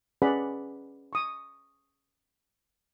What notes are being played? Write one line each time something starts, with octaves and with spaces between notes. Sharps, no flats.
C#4 G#4 B4 D5 F#5 B5
C#6 D#6